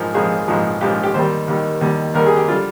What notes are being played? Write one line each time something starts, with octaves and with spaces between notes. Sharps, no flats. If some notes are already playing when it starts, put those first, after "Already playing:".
Already playing: A#1 G#2 F3 A#4
A#1 G#2 F3 G#4
A#1 G#2 F3
A#1 G#2 F3 G4
G4
D#2 D#3 G3 C5
D#2 D#3 G3
D#2 D#3 G3
D#2 D#3 G3 A#4
G#4
G4
D3 G3 F4